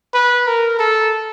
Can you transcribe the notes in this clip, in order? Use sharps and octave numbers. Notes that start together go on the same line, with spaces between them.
B4
A#4
A4